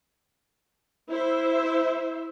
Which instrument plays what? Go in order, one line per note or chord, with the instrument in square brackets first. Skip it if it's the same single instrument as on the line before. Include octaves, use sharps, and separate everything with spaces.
[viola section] E4 C5 E5